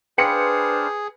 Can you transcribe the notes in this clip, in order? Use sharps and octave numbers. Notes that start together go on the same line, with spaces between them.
D4 G#4 B4 C5 F5 G5 C6 C#7